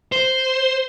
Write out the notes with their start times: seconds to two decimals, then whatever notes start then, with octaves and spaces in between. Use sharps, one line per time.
0.12 C5